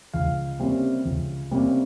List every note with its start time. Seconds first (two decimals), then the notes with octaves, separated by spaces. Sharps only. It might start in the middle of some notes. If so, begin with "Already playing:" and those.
0.14 C#2 F5
0.60 C3 G3 A#3 C#4
1.05 C#2
1.51 C3 G3 A#3 C#4